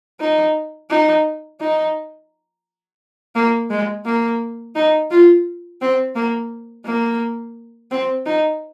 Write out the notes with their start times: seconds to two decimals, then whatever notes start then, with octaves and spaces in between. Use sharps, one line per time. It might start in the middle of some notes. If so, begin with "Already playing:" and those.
0.21 D#4
0.90 D#4
1.61 D#4
3.35 A#3
3.70 G#3
4.05 A#3
4.75 D#4
5.11 F4
5.81 C4
6.16 A#3
6.85 A#3
7.91 C4
8.26 D#4